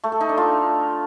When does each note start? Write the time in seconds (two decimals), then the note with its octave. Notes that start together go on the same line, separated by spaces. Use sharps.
0.04 A3
0.12 A4
0.21 D#4
0.29 D4
0.38 F4